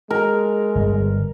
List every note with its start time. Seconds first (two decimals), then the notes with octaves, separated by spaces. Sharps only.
0.10 G#3 A#4
0.75 G1